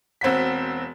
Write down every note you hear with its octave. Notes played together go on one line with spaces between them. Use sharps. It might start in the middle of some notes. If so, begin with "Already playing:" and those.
E1 C4 F#4 B6